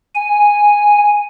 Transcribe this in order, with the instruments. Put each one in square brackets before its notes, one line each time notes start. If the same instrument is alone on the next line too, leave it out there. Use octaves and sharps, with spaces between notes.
[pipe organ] G#5